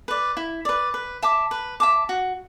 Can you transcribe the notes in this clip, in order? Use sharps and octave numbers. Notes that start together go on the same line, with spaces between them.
B4 D5
E4
B4 D5
B4
E5 A5 D6
B4
E5 A5 D6
F#4